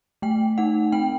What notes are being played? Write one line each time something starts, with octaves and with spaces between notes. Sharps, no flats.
A3 G5
D#4 F#5
C4 G5